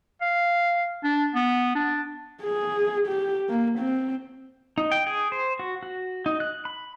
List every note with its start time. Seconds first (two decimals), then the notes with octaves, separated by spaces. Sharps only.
0.21 F5
1.04 D4
1.34 B3
1.75 D4
2.43 G#4
3.07 G4
3.49 A#3
3.79 C4
4.78 D#4
4.92 G5
5.07 G#4
5.32 C5
5.59 F#4
5.83 F#4
6.26 D#4
6.40 F#6
6.65 B5